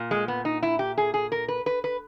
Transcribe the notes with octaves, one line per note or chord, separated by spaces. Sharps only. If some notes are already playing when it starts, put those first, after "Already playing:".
Already playing: A#2
G#3
B3
D#4
E4
G4
G#4
G#4
A#4
B4
B4
B4